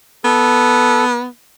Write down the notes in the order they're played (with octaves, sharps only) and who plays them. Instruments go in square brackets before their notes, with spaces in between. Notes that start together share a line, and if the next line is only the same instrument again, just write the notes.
[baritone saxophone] B3 [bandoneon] A4